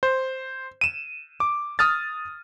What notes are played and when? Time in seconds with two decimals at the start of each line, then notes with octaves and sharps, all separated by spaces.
0.03 C5
0.81 D#7 E7
1.40 D6
1.79 D#6 F6 A6